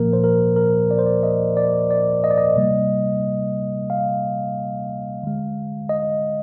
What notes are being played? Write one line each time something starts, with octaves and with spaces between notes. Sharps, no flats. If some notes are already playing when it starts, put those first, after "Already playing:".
Already playing: A#2 F3 A#3 A#4
C5
A#4
A#4
D5
C5
D5
D#5
D5
D5
D#5
D5
D#5
C3 G3 A#3
F5
D3 G#3
D#5